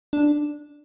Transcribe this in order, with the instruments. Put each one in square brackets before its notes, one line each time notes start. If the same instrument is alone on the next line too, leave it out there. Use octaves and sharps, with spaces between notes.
[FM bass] D4